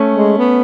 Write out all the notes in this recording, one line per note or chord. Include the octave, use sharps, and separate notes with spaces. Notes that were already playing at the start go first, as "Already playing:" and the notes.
Already playing: A3 C#4
G#3
B3